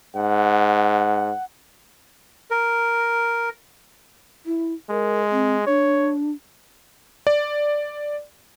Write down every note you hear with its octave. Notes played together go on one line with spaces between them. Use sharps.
G#2 F#5
A#4
E4
G#3 A#4
C4
D4 C#5
D5